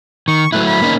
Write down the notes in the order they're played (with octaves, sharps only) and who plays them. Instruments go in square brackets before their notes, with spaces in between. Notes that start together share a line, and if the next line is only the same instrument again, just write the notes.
[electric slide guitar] D#3 [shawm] C#6
[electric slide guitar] F#3 A3 E4 [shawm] B4
[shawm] B5
[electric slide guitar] A#3 C#4 D#4